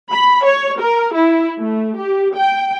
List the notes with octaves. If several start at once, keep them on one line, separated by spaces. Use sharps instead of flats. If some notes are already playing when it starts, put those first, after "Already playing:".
B5
C#5
A#4
E4
A3
G4
G5